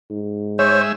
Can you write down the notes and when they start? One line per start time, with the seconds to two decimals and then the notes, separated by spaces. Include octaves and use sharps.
0.10 G#2
0.59 G#3 C5 C#5 E5